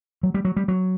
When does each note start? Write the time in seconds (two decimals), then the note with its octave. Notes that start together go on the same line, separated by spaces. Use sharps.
0.23 F#3
0.34 G3
0.45 F#3
0.57 G3
0.68 F#3